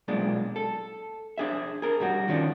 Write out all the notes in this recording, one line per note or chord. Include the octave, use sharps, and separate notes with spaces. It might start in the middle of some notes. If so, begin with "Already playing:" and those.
B1 A#2 G#3 D4
A4
D4 G#4 E5
G#4 A#4
G2 G3 F#4
D#3 F3 C#4 D4